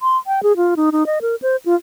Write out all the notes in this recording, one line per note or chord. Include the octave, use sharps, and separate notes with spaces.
C6
G5
G#4
F4
D#4
D#4
D#5
A#4
C5
F4